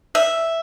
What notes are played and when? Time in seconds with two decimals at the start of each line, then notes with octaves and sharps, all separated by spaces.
0.15 E5